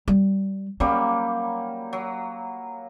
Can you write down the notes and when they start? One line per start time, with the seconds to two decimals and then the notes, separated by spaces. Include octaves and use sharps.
0.08 G3
0.80 F#3 G3 A#3 C#4
1.93 F#3